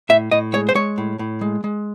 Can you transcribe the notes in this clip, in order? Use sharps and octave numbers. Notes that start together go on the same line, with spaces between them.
A2 E5
A2 D#5
G#3 C#5
C5
G#3 C#5
A2
A2
G#3
G#3